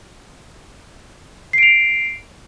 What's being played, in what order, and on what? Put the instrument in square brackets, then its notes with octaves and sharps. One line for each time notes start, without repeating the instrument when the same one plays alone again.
[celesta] C7
D7
F7